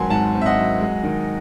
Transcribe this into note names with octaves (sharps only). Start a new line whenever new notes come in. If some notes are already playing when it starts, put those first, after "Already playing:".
Already playing: G#1 F#3 C4 F#5 G#5 A5 C6
G#2 F#5 A5
C4
E5
D#5 F#5
F#3
G#3
D#3